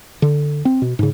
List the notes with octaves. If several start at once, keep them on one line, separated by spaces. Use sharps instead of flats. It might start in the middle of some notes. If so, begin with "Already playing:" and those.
D3
C4
B2
G#2 C#3